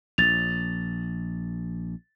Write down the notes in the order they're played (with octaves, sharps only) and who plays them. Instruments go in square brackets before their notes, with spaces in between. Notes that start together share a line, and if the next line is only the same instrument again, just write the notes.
[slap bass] A#1 [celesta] A6 F7